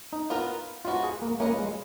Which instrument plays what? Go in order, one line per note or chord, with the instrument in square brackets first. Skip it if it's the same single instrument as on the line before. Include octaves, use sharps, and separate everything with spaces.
[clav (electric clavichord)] D#4
[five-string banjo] B3 F4 A#4
[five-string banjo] F3 G#3 B3 F#4 [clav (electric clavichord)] F4
[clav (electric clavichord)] G#4
A#3
[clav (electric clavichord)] A#3 [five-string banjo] C#4 F4 B4 D#5
[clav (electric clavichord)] G#3